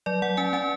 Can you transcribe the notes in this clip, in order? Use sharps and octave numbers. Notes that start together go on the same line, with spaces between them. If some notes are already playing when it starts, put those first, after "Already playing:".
F#3 D5
F#3 F#5
C#4 G#5
C#4 G#5